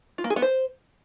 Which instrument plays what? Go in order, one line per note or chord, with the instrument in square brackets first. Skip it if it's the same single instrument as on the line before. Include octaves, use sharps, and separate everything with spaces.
[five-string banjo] F4
A#3
G#4
B3
C5